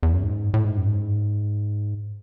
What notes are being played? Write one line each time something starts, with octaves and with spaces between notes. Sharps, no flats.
E2
F#2
G#2
A2
G#2
F#2
G#2